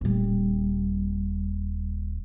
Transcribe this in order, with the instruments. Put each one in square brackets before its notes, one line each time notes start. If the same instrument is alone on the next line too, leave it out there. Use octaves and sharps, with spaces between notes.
[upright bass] D#1 G3